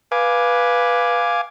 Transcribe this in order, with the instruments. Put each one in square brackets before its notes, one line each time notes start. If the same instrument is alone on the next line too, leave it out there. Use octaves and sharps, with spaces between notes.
[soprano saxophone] B4 [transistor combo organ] F5 G#5 D6